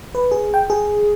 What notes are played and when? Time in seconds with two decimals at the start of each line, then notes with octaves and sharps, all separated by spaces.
0.15 B4
0.31 G#4
0.54 G5
0.70 G#4